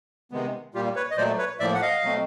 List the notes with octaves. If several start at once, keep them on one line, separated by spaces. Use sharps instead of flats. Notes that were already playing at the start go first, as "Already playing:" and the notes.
C3 D#3 G#3 B3
A#2 G3 A#3 F4 G4
B4 C#5
D#5
A#2 F#3 A3 C5 D5
B4 C#5
A2 F3 A#3 D5 E5
F#5
D#5 F5
B2 F#3 A3 C4